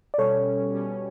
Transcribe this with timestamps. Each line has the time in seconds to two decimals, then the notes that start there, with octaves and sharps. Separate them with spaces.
0.14 D5
0.18 B2 G3 C#4 A4 C#5
0.73 B2 G3 C#4